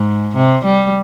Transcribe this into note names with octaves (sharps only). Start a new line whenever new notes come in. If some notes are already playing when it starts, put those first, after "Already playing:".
Already playing: G#2
C3
G3